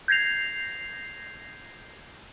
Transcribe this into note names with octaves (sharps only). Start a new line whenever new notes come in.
G6 G#6 A#6 C7 F7